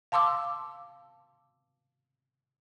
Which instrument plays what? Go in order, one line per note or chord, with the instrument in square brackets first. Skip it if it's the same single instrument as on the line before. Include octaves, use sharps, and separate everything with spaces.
[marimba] F5 A5 C6 D6 E6